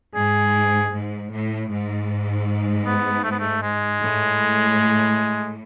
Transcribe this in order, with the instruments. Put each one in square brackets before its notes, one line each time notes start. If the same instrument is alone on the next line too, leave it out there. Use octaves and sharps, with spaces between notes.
[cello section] G#2 [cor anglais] G#4
[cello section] G#2
A2
G#2
[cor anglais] B3
A3
B3
A3
G#3
[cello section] A2